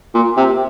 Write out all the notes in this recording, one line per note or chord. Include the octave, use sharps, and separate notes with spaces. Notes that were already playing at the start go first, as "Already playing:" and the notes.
A#2
C3